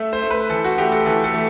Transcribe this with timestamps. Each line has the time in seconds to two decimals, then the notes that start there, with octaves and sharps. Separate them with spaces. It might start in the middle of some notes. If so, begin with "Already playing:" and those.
Already playing: A3 E5
0.13 C5
0.22 A3
0.31 B4
0.50 E3 A4
0.64 F#4
0.78 A3 G4
0.92 A4
1.06 E3 A4
1.24 A4
1.34 A3